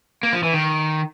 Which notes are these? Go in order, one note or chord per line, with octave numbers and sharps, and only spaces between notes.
A#3
F3
E3
D#3